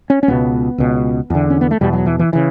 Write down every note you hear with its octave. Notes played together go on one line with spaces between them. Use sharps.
C#4
C#4
C#2 B2 B3
C#2 B2
E2 D3
C#4
B3
A3
E2 B2 G3
F#3
E3
E3
C#3 E3